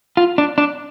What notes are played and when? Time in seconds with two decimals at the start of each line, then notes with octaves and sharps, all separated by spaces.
0.17 F4
0.38 D4
0.58 D4